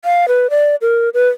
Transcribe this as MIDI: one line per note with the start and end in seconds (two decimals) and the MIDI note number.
0.05 0.28 77
0.28 0.50 71
0.50 0.76 74
0.82 1.09 70
1.14 1.28 71